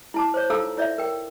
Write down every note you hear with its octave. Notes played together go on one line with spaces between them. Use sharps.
E4 A5 D6
C5 C#5
D#4 F4 A4 F5 A#5 E6
E4 C#5 D5 E5 F5
A#4 G5